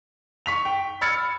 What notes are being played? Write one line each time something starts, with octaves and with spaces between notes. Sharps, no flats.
C#6 B6 F7
G5
B5 E6 F6 G#6 A6 C#7